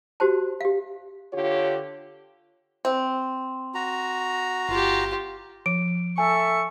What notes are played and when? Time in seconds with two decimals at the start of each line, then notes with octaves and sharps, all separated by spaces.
0.20 F#4 G4 C5 A5
0.61 G4 F5
1.32 D3 F4 G4 C#5
2.85 C4
3.74 F#4 A#5
4.69 G1 F4 G4
5.66 F3 D7
6.18 A4 E5 G#5 C#6